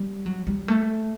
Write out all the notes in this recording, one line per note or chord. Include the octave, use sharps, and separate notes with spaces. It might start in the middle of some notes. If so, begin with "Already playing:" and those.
Already playing: G3
F#3
G3
A3